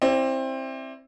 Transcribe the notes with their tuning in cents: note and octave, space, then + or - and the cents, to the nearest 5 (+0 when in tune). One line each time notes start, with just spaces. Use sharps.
C4 +20 E4 +0 D5 +0